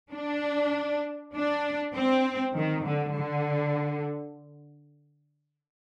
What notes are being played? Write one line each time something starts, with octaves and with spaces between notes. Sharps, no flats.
D4
D4
C4
D#3
D3
D3